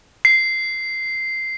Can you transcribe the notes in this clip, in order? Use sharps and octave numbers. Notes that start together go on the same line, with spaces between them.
C7